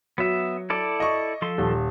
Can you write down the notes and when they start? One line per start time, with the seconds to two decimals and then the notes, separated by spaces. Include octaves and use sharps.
0.18 F#3 B3 E5
0.70 E4 A4 D5
1.00 D#5 C#6
1.42 F3 A4 C6
1.58 D#1